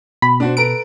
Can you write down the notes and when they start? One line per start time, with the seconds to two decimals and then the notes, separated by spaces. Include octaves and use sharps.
0.22 B2 B5
0.40 D4 F#4 C5
0.57 A4 B4 A#5 D7